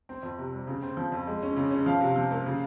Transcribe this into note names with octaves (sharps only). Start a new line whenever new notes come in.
C4
F2
C3
G3
C#3
C4
F3
F2
G#3
C#4
C#3
C#4
F3 F5
C3
F3
A#3
C#3